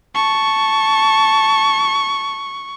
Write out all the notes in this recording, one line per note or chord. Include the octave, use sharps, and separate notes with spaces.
A5 C#6